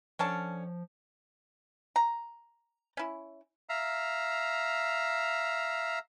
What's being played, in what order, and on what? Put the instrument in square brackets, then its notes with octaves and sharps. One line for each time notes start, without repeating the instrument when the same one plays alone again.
[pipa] D3 C#4 A5 [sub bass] F3
[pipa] A#5
C#4 E4
[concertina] E5 F5 A#5